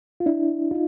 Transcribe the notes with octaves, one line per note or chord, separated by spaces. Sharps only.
F4
D4 E4
D#4 F4